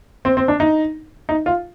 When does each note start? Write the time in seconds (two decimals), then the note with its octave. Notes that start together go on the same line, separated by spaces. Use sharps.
0.25 C4
0.37 C4
0.48 D4
0.60 D#4
1.29 D#4
1.46 F4